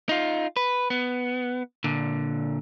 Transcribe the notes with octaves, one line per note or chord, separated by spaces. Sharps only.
D#4 F4
B4
B3
A#2 D3